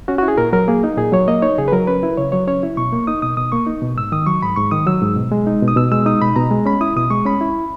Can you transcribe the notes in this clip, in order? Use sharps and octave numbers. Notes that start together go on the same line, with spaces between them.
C#4 F#4
F#4
E4
G#4
A#2 A#4
F#3 A#4
A#3 G#4
D#4
A#2 G#4
F#3 C#5
A#3 D#5
D#4 C#5
C#3 G#4
B4
F#3 A#4
C#4 B4
E4
C#3 C#5
F#3 C#5
C#4 C#5
E4
B2 C#6
A#3
D#4 D#6
B2 D#6
B2 D#6
A#3 C#6
D#4
B2
G#2 E6
D#3 D#6
F#3 C#6
G#2 B5
G#2 C#6
D#3 D#6
F#3 E6
G#2
B2
G#3
D#4
B2
D#6
B2 E6
G#3 E6
D#4 D#6
B2 B5
B2 A#5
G#3
C#4 B5
E4 D#6
B2 D#6
G#3 C#6
C#4 B5
E4